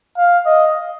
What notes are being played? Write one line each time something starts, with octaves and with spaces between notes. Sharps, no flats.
F5
D#5